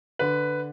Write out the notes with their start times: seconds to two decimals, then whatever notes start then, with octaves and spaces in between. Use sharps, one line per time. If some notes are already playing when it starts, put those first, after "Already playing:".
0.19 D3 B4